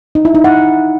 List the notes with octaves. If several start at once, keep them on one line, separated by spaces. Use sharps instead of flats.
D#4
E4
D#4
F#5